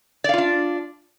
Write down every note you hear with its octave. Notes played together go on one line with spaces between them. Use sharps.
D4 F4 D5 F5